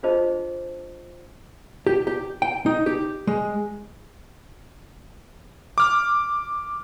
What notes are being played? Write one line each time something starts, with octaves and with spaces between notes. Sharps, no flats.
D4 F4 G#4 C5 D#5 A5
G4
G4
G5
D#4
G4
G#3
D6 F6